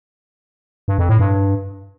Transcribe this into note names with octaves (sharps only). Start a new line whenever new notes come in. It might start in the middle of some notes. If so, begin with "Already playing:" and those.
G2
F2
A2
G2